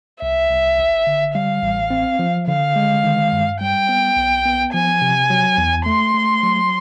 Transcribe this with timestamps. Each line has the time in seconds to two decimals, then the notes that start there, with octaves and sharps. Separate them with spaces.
0.22 C2 E5
0.50 C2
0.79 G1
1.07 D3
1.35 G3 F5
1.63 A1
1.90 C4
2.19 F3
2.47 D3 F5
2.76 G#3
3.04 D#3
3.32 G2
3.61 G3 G5
3.89 B3
4.16 B1
4.46 B3
4.73 F3 G#5
5.02 C3
5.30 F#3
5.58 E2
5.86 A3 C6
6.14 A3
6.43 F#3